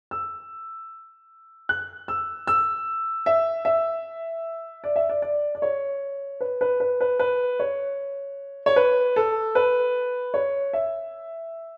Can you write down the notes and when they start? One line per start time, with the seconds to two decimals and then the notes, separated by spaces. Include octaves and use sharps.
0.11 E6
1.69 F#6
2.08 E6
2.47 E6
3.26 E5
3.65 E5
4.84 D5
4.96 E5
5.09 D5
5.22 D5
5.55 D5
5.62 C#5
6.41 B4
6.61 B4
6.80 B4
7.01 B4
7.19 B4
7.60 C#5
8.66 C#5
8.76 B4
9.16 A4
9.55 B4
10.34 C#5
10.73 E5